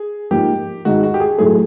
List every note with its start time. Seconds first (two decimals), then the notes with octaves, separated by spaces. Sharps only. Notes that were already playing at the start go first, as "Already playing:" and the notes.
Already playing: G#4
0.31 G#2 F3 A#3 G4
0.85 G#2 D#3 G#3 F#4
1.03 F#4
1.14 G4
1.20 G#4
1.38 A2 F#3 A3 G#4